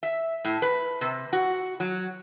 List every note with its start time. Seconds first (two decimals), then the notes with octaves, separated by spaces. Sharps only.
0.03 E5
0.45 A2
0.62 B4
1.01 C3
1.33 F#4
1.80 F#3